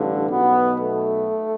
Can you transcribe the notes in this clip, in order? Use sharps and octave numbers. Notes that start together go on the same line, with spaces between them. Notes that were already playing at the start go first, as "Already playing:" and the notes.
Already playing: A1 G2 D3
B1 B2 B3
A3